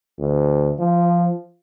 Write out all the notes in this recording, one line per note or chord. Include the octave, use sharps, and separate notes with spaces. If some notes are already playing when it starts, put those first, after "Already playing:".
D2
F3